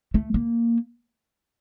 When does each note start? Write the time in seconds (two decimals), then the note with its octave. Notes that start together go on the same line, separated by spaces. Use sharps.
0.14 A3
0.34 A#3